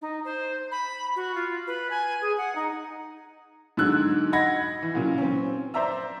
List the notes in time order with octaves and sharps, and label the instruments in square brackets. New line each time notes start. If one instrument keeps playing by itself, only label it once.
[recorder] D#4
C5
B5
F#4
F4
B4
G#5
G#4
F#5
D#4
[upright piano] G#2 D3 F#3 E6 F#6 G#6
D#5 F#5 B5 G#6 A#6
E3
A#2 C#3 F#3
C4 C#4
C5 D5 E5 A#5 E6